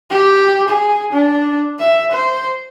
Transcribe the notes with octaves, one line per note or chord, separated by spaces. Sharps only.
G4
G#4
D4
E5
C5